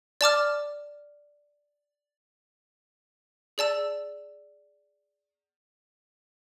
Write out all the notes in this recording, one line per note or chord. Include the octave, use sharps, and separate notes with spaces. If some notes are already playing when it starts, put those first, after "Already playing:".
D5 A5 D6 F6
G#4 D5 A5 E6